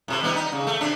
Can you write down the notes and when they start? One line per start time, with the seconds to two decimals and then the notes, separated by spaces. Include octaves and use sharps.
0.08 A2 C3
0.22 G3 B3 D#4
0.36 D#4
0.52 C#3
0.67 A3
0.81 C3 D4